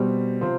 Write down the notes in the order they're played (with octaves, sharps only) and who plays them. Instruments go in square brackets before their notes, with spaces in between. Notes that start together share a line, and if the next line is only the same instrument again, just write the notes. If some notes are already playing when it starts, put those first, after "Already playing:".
Already playing: [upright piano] B2 G3 C4
C3 F3 C4